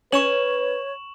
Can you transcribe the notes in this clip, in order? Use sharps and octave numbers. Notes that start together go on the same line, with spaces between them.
C#4 B4 C#5 C#6 E7 F#7